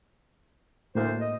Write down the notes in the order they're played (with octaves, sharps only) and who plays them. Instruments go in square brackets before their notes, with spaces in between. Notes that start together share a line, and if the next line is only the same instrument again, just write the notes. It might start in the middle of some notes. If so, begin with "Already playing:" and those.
[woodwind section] D2 C5 [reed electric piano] A2 A#3
[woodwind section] D#5